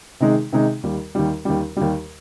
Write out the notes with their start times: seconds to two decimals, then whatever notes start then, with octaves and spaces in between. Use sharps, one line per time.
0.20 C3 D#3 G#3 D#4
0.52 C3 D#3 G#3 D#4
0.83 D#2 D#3 G3
1.15 D#2 D#3 G3
1.45 D#2 D#3 G3
1.77 D#2 D#3 G3